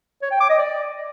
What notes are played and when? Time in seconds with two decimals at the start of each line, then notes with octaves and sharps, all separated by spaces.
0.22 C#5
0.31 G5
0.40 D6
0.49 D#5
0.59 D5